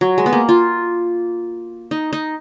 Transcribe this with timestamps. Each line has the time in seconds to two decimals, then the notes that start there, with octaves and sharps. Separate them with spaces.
0.01 F#3
0.18 G#3
0.26 B3
0.33 A#3
0.49 F4
1.91 D#4
2.13 D#4